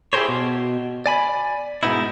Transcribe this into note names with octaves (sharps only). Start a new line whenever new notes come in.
E4 G4 G#4 A#4 C5 C#5
B2
D5 G#5 B5
G#2 B2 D#3 B3 D#4 E4